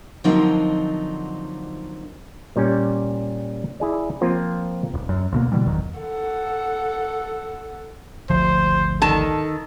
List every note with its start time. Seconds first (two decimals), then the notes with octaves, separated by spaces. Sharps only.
0.24 D3 F3 F#3 A#3 C4 D#4
2.56 A#2 G3 C#4
3.80 E4 G#4 D5
4.21 F3 A#3 C4 F4
4.94 D#1
5.09 F#2
5.33 D2 B2 A#3
5.52 B2 D3 E3 G3
5.67 G1 E2 D#3 F#3
5.99 A4 F#5
8.30 G#1 D2 F3 C5
9.02 D#3 A4 A5